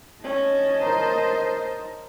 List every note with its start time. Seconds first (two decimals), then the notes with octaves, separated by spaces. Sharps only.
0.23 C#4 D#5 A5
0.81 A#4 C5 A#5